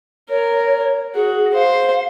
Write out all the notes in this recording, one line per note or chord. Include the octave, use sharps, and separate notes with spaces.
A#4 C#5
F#4 G#4
C5 F5